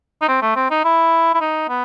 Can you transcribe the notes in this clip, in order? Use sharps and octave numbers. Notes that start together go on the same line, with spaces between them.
D#4
C4
A3
C4
D#4
E4
E4
D#4
B3